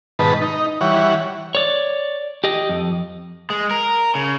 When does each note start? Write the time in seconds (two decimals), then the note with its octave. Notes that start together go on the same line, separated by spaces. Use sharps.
0.19 G#2 B2 D#3 B4 A5
0.41 D#4
0.81 E3 G3 C#5 F#5
1.55 C#5 D5
2.44 G4 D#5
2.69 F2
3.50 G#3
3.71 A#4
4.15 C#3